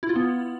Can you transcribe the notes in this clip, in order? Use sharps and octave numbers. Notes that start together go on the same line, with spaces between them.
E4
F4
B3